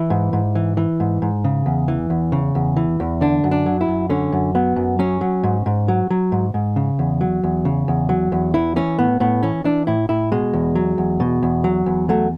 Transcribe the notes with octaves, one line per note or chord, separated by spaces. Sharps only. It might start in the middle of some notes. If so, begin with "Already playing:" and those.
Already playing: E3 E4
G#2
G#2
E3
E3
G#2
G#2
C#3
E2
E3
E2
C#3
E2
E3
E2
D3 D4
F#2
D4
F#3
E4
F#2
D3 C#4
F#2
F#3 B3
F#2
F#3 C#4
F#3
G#2
G#2
F#3
F#3
G#2
G#2
C#3
E2
F#3
E2
C#3
E2
F#3
E2
E3 E4
E3 C#4
A2 B3
A2 B3
E3 C#4
E3 D4
A2 E4
A2 E4
B2 G#3
E2
F#3
E2
B2
E2
F#3
E2
F#3 A3